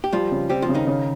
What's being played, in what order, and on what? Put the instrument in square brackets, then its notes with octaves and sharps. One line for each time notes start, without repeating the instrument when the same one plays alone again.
[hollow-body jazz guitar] G4
[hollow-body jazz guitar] F3 F4 [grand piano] G3
[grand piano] C#3
[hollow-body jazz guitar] G3 G4 [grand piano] C4
[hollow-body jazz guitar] F3 F4
[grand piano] C#3
[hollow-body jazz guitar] D#3 D#4
[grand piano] C#3